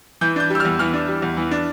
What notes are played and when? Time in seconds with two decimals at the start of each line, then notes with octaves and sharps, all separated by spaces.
0.21 E3 G6
0.36 D4 G6
0.50 G3 E6
0.60 F6
0.65 E2
0.79 E3 F6
0.94 D4
1.08 G3
1.22 E2
1.37 E3
1.51 D4